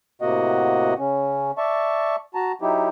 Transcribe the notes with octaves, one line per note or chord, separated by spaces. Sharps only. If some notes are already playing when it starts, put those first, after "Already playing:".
A2 C3 A#3 F#4 D#5 F#5
C#3 C#4
D5 E5 A5 C#6
F#4 A5 A#5
F#3 D#4 E4 G4